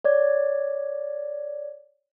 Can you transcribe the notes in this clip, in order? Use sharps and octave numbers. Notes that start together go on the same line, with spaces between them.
C#5 D5 G#6